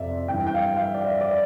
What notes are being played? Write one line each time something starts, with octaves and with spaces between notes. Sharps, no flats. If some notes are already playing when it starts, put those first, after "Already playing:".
Already playing: F2 C3 D5 E5
G2 E3 G5
G5
F5
F5
E5
D5
E5
D5